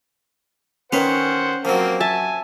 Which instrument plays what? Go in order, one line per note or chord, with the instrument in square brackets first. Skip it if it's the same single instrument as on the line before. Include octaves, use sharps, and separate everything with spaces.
[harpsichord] D#3 B4 C6 [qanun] C#4 [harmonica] C5 F#5
[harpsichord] F3 F#3 [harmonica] A#3 C4
[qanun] E5 A5 [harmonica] G#5